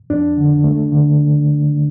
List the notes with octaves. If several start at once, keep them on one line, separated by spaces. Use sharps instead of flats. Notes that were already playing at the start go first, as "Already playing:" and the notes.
F2 D4
D3
A3
D3